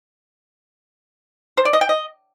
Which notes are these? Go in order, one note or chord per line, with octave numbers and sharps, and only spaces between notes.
C5
D5
D#5
G5
D#5